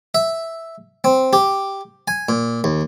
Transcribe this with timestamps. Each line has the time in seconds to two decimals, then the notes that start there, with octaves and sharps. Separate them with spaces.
0.15 E5
1.04 C4
1.33 G4
2.08 G#5
2.29 A#2
2.64 D#2